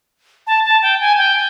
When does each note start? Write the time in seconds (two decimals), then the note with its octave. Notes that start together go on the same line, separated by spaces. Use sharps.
0.47 A5
0.65 A5
0.82 G5
1.00 G#5
1.18 G5